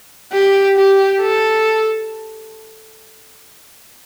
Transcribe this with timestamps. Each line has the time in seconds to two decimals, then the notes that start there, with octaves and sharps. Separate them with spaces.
0.33 G4
0.77 G4
1.21 A4